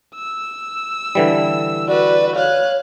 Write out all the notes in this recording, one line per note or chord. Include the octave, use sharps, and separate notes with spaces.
E6
D3 E3 G3
F#4 B4 D5
C#5 F5 F#6